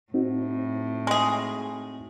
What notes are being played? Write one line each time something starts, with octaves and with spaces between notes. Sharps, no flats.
A2 C4 D#4 F#4
G#3 G#4